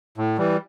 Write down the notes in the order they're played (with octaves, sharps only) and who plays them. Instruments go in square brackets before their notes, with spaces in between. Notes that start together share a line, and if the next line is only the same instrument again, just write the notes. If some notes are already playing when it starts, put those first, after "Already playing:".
[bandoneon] A2
E3 G3